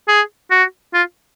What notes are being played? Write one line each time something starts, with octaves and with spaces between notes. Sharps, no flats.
G#4
F#4
F4